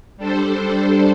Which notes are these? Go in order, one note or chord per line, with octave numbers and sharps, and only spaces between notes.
G3 D4 A4 C5